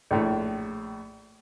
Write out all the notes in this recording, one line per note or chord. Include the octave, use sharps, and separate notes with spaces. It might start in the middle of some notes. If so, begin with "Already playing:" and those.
A#1 A2